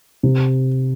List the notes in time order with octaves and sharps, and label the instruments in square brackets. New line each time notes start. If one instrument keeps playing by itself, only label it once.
[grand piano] C3